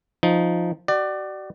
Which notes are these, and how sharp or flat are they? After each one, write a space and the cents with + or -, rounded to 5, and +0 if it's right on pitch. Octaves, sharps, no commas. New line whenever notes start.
F3 +0 D#4 +0
F#4 +40 D5 +20